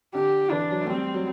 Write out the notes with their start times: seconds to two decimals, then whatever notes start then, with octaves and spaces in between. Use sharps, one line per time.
0.14 D3 G4
0.51 E3 D4
0.71 F#3
0.82 A3
0.89 G3 C4
1.14 F#3